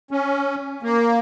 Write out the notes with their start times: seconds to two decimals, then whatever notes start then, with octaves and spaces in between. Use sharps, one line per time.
0.11 C#4
0.83 A#3